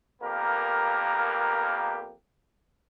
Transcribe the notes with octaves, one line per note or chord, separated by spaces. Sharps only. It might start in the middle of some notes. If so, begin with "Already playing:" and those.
F2 A#3 B3 G4 A#4